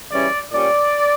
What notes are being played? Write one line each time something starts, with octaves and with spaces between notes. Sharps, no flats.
C#3 E3 G3 C#4 D5
A#2 G3 C#4 D5